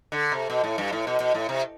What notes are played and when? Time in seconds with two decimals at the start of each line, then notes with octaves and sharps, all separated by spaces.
0.12 D3
0.32 C3
0.50 B2
0.63 A2
0.78 G2
0.92 A2
1.07 B2
1.20 B2
1.34 A2
1.49 C3